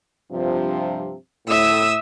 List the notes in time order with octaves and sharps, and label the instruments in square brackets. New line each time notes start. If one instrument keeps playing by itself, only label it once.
[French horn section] G2 C3 F3
[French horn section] A2 [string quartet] E5 D#6 E6